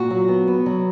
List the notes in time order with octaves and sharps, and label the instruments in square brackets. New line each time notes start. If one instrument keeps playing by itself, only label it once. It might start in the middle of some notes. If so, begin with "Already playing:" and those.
Already playing: [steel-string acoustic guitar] A#2 F#4
F#3
B3
B3
F#3